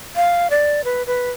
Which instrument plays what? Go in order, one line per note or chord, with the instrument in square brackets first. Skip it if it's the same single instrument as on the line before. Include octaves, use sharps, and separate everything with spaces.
[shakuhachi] F5
D5
B4
B4